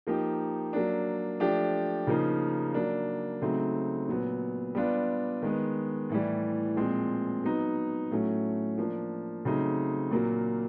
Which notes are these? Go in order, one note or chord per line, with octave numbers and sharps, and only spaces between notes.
F3 A#3 D#4 G4
F#3 A#3 D4
F3 A3 D4 G4
C#3 F3 A#3 D#4
F#3 A#3 D4
C#3 F#3 A3 C4 D#4
A#2 F#3 B3
G3 B3 D4 F4
D#3 G#3 B3
A2 E3 G3
A#2 F3 G#3 C4
F#3 B3 D#4
A2 F#3 A3 C#4
F3 A#3 D4
C#3 F#3 A3 C4 D#4
A#2 F#3 A#3